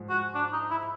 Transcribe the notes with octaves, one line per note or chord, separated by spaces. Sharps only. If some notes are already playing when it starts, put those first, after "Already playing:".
Already playing: G#2 F3 G#3
F#4
D4
D#4
E4